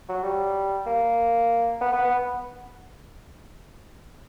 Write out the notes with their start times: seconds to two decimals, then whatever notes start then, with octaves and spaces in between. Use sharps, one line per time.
0.09 F#3
0.24 G3
0.86 A#3
1.81 B3
1.93 B3
2.04 B3